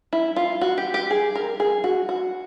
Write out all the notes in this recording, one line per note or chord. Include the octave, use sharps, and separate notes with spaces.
E4
F4
F#4
G4
G4
G#4
A#4
G#4
F#4
F#4